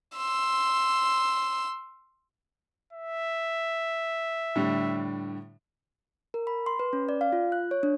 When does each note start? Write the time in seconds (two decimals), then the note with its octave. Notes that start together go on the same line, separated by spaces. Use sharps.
0.17 C6 E6
2.93 E5
4.56 A2 D3 G3
6.34 A#4
6.47 B5
6.66 C6
6.79 B4
6.93 C#4
7.09 D5
7.21 F5
7.33 F4
7.52 F#6
7.71 C#5
7.83 D4